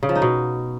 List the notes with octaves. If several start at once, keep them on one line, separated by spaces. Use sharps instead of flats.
C#3
F3
D#4
B2